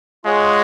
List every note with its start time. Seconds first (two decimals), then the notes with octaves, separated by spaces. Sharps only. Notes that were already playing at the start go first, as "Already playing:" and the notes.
0.24 G#3 F4 G#4 C#5 F#5